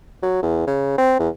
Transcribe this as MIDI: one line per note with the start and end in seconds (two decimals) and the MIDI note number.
0.22 0.42 54
0.42 0.63 40
0.67 0.96 49
0.98 1.14 60
1.19 1.29 40